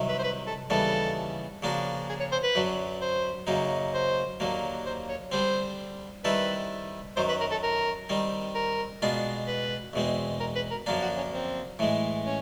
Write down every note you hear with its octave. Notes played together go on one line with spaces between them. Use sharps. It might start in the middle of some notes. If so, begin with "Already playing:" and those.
Already playing: C2 C3 D#3 F#3
B4
C5
B4
A4
D#2 C#3 E3 G3 B3 A4
C#3 F3 A#3 D4 F#4
G#4
C#5
C5
B4
F#2 D3 F#3
C5
F#2 C#3 F#3 A#3 D#4
C5
D#2 D3 F#3 A#3
C5
C#5
D3 G3 C4 C5
D#3 G3 C4 E4 A4 B4
F#2 D#3 F#3 C5
B4
A#4
A4
A#4
D#3 G3 C4
A#4
B2 G#3 B3 D4 F4
B4
E2 B2 G#3 C4
A#4
B4
A#4
F#2 D3 F3 A#3 D4
F#4
C#4
C4
A2 E3 G#3
C#4